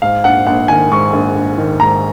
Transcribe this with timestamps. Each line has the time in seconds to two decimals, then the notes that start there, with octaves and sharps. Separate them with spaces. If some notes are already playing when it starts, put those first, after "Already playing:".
0.02 G#2 F5
0.24 A#1 F#5
0.46 A#1 F#5
0.68 D#3 G#5
0.91 G#2 C#6
1.13 A#1
1.35 A#1
1.58 D#3
1.80 G#2 A#5